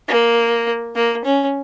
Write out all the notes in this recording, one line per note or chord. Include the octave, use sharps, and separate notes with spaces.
A#3
A#3
C#4